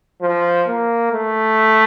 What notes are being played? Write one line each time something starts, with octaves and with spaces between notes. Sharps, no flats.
F3
A#3
A3